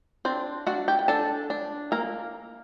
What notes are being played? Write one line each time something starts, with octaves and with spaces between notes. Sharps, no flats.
C4 D4 C5
D4 F#4 F#5
G4 G5
G5
D4 A4 A5
D4
A#3 A#4 A#5